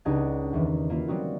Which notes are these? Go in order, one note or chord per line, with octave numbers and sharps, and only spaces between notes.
C#2 D4 D#4 G4 F#5 G#6
E2 D#3 E3
A#3 E4 F4
F#3 G3 C4 D#4 F#4